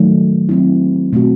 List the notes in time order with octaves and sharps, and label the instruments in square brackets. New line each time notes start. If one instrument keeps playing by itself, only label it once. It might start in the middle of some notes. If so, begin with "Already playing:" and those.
Already playing: [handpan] D#3 F#3 A3
F#3 C4 E4
B2 A3 C4 F#4